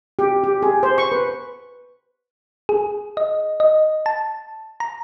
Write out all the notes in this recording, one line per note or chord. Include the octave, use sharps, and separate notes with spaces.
G4
G4
G#4
C5
C#6
B4
G#4
D#5
D#5
A5
A#5